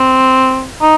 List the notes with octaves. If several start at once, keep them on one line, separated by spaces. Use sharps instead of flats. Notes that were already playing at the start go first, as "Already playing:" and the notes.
Already playing: C4
D#4